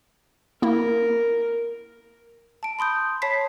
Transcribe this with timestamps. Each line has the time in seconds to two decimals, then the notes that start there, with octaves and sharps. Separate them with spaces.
0.62 A#3 E4 A#4
2.63 A5 D7
2.79 B5 C6 D#6 G6
3.22 C#5 A5 B5 C6 B6 C7